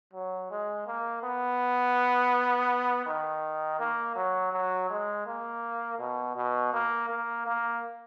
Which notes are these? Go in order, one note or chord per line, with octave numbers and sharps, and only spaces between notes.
F#3
G#3
A#3
B3
D#3
A#3
F#3
F#3
G#3
A#3
B2
B2
A#3
A#3
A#3